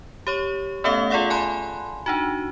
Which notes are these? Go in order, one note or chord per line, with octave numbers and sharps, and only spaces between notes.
G4 C#5 C#6
A3 B3 C#4 A4 E5 F5
F4 G#4 A4 D5 F5 F#5
G#5 A5 B5 C6 F#6
D4 D#4 F#4